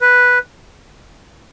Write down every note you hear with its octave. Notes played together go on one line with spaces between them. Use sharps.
B4